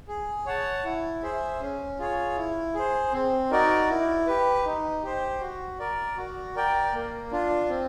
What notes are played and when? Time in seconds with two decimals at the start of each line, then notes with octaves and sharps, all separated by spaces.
0.08 G#4
0.46 C#5 F#5 A5
0.84 E4
1.22 G#4 C5 E5
1.60 C#4
1.99 F4 G#4 C#5
2.37 E4
2.75 G#4 C5
3.12 C4
3.50 D#4 F#4 A#4 D5
3.89 E4
4.27 G4 B4
4.65 D#4
5.03 G4 C5
5.40 F#4
5.79 A#4 D5
6.17 F#4
6.56 A#4 D5 G5
6.94 A#3
7.31 D4 F4
7.69 C4